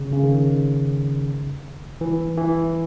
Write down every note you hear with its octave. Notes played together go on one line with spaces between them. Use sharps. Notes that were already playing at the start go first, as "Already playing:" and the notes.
Already playing: C#3
C#3
D#3
E3
E3